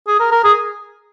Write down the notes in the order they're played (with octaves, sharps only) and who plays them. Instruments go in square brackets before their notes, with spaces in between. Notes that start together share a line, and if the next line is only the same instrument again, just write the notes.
[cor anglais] G#4
A#4
A#4
G#4